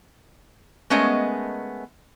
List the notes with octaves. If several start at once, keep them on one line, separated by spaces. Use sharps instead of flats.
G#3 A3 B3 C#4 A#4 D#5